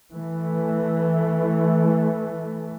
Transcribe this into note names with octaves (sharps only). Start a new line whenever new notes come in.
E3 A3